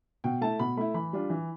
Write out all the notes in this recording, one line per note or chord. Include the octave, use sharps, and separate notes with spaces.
B2 G5
A3 E4 A5
B2 B5
A3 E4 B5
E3 B5
G3 D4 F4
E3